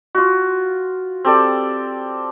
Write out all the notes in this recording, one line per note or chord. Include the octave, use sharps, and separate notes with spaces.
F4 F#4
C4 G4 A4 D5